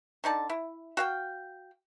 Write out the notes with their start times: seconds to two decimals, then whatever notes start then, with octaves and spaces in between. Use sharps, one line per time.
0.24 D3 D#4 D5 A5
0.49 E4
0.97 F#4 F5 G5